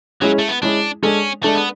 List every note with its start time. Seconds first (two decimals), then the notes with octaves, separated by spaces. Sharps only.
0.21 F#3 G#3 C#4 E4 G#4
0.39 A3
0.48 B3
0.62 G#3 C#4 D4 E4 G#4
1.03 G#3 C#4 D4 A4
1.43 G#3 A3 D4 A4
1.55 B3